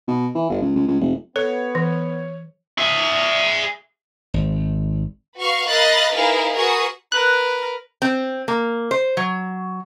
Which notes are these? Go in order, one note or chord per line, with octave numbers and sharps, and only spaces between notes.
B2
E3
G1
C#2
C#2
C#2
F1
B3 A4 C#5
E3
G#4 E5
G#1
F#4 B4 F5 C#6
A#4 D#5 F5 B5 F#6 A6
D#4 E4 G#4 A#4 B4 F5
F#4 G#4 A#4 B4 C#6 D#6
A#4 B4 F#6
C4
A#3
C5
F#3